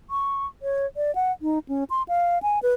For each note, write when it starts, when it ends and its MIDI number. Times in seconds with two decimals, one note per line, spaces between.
0.10 0.46 85
0.62 0.86 73
0.97 1.14 74
1.15 1.32 78
1.42 1.59 63
1.69 1.84 61
1.90 2.03 84
2.08 2.38 77
2.42 2.59 80
2.63 2.74 71